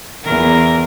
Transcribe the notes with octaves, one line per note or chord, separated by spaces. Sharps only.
E2 A#4